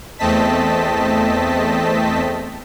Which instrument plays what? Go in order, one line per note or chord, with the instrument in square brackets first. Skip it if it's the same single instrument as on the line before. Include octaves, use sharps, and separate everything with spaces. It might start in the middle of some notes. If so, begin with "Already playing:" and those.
[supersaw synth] E2 A3 C4 D#5 A5 B6